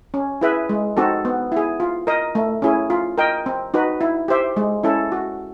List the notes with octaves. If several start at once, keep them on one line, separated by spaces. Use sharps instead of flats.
C#4
E4 G#4 B4 E5
G#3
C4 D#4 F#4 A4
B3
E4 G#4
F4
A#4 D#5
A3
C#4 E4 G#4
F4
A#4 D#5 G5
C4
D#4 F#4 B4
E4
G4 C5 E5
G#3
C#4 E4 A4
F#4